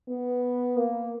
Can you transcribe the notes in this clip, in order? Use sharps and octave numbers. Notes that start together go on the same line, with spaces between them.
B3
A#3